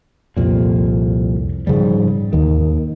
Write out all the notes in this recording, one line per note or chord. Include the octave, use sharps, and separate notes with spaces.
C2 F2 A#2
G#2 C#3 F3 G3
D#2 D#3